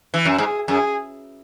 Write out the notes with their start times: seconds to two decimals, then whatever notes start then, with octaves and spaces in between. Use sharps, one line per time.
0.14 E3
0.25 F#2
0.38 G#2 G#4
0.68 F#2 G#4